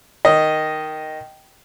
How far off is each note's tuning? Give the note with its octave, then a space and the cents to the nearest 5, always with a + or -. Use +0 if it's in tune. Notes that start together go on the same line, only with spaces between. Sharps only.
D#3 +0 D#5 +0